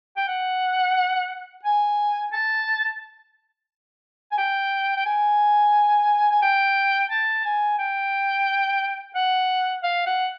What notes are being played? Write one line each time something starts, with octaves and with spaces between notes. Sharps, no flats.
G5
F#5
G#5
A5
G#5
G5
G5
G#5
G#5
G5
A5
G#5
G5
F#5
F5
F#5